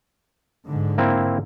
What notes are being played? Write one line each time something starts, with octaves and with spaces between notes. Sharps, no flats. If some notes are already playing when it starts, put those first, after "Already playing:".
G#2 D3
A#3 C4 E4